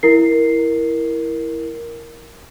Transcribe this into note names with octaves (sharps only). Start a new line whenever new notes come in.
E4 A#4 C7